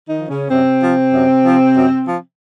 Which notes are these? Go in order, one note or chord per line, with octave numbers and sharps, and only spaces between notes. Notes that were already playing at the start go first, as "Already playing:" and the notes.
D#3 D#4
F3
C#3 C#4
F#2 C3 C4
F3
F#2
F3
F#2
F3